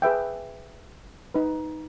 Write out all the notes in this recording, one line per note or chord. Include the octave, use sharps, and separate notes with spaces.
G#4 B4 E5 G5
D#4 B4